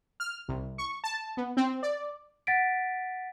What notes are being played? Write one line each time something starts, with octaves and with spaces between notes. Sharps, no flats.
F6
C2
C#6
A5
B3
C4
D5
F#5 A6 B6 D7